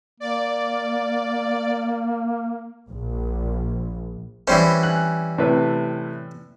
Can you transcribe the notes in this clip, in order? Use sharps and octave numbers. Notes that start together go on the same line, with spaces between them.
A#3 D5
A#1
E3 G3 C#4 C5 B5
G#5 F#6
A2 C3 B4